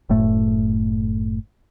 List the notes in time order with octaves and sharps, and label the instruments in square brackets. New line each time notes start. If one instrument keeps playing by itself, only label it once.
[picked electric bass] F#1 A2 A3